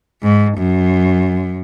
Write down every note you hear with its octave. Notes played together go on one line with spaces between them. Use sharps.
G#2
F#2